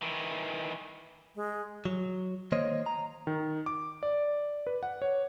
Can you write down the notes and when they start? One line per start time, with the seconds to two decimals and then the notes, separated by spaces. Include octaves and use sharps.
0.02 D#3 E3
1.36 G#3
1.85 F#3
2.52 D#3 A#3 C5 C#5 D#5
2.86 A#5
3.27 D#3
3.66 D6
4.03 D5
4.67 B4
4.83 F#5
5.02 C#5